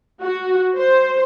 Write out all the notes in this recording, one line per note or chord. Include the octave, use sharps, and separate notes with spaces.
F#4
C5